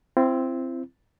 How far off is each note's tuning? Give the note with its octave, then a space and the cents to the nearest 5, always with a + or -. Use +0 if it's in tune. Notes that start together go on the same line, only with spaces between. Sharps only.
C4 +0 E4 +40